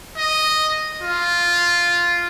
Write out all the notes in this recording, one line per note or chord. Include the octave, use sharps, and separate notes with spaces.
D#5
F4